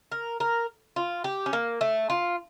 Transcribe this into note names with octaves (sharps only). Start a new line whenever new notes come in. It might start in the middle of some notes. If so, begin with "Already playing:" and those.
A#4
A#4
F4
G4
C#4
A#3
A3
F4